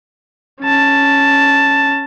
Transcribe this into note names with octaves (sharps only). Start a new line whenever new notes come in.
C#4 A5